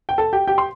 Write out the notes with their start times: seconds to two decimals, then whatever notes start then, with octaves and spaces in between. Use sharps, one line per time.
0.09 G5
0.18 A4 A5
0.33 G4 G5
0.48 G4 G5
0.58 C6